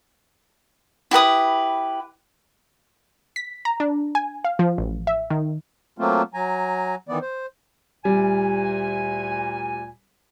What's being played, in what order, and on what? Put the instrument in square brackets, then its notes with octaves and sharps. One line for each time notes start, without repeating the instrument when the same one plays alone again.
[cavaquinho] E4 G4 B4 D#6
[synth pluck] B6
A#5
D4
G#5
F5
F3
A1
E5
D#3
[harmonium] F#3 A3 A#3 C4 F4
F#3 G#5 A#5
D#3 E3 B3 D5
C5
[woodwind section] D2 A#2 G#5 [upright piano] G3